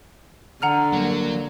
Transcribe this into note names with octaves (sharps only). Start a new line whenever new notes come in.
D3 F#5 A#5 F6
F#3 G3 A#3